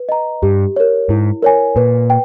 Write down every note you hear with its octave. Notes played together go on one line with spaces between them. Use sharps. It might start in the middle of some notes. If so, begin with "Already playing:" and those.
Already playing: B4
D#5 A#5
G2 G4
A#4 C#5
G#2 E4
A#4 C#5 G#5
A#2 B4
G5